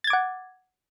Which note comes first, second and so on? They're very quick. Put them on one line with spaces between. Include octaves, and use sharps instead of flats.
A6 G#6 D6 F#5